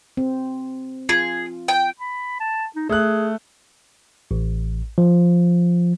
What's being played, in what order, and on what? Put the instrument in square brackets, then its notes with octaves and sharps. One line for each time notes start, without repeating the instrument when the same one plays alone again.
[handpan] C4
[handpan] F4 [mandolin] G#4
[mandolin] G5
[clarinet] B5
A5
D#4
[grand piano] A3 F#6 [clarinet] G#4
[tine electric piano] A1
F3